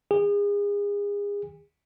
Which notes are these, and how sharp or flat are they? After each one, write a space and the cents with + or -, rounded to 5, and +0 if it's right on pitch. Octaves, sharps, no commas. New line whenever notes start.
G#4 -35